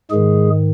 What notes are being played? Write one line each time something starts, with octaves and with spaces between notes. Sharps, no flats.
G#2 D#3 G#3 G#4